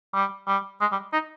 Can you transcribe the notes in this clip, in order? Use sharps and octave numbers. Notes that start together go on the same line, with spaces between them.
G3
G3
G#3
G3
D#4